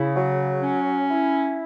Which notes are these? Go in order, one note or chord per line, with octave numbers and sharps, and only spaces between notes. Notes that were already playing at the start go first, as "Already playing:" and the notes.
Already playing: C#3 E4
F#3
C#4
E4